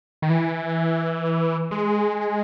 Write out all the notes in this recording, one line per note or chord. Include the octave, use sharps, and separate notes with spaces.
D#3
E3
G#3